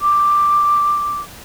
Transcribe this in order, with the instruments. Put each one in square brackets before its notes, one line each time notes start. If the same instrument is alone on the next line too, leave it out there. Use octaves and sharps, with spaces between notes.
[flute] D6